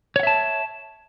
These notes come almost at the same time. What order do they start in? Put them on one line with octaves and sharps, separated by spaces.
C#5 F#5 E5 A5